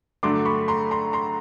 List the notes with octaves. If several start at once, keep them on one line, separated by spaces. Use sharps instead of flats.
G2 D3 F#3 A3 D4 C6 D6
B5 C#6
A#5 C6
A#5 C6
A#5 C6